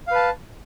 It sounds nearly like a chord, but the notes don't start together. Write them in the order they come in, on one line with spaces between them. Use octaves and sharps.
F5 B4 A5